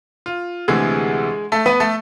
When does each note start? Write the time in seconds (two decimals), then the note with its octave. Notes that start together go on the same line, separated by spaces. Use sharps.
0.26 F4
0.68 D2 C3 E3 G#3 G#4
1.52 A3 A4
1.66 B3 B4
1.80 A3 A4